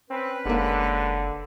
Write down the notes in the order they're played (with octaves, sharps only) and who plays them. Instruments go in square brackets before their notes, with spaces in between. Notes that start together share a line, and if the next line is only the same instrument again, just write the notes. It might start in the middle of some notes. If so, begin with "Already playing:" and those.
[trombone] C4 [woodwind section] C#4 B4
[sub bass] F#1 [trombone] D3 [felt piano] G#3 A#3